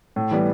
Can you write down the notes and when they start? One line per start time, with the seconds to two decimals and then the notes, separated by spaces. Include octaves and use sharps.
0.16 A2
0.31 E3 G3 B3